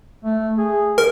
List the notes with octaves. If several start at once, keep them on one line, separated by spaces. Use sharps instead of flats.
A3
G#4
A#4